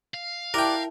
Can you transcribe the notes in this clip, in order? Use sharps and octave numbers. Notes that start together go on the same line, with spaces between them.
F5
E4 G4 A#4 D5 E5 G5 A5 F#6